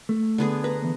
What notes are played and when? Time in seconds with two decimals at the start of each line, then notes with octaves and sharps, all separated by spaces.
0.09 A3
0.38 D3 B3 G#4
0.64 B4 A#5
0.82 E3 B3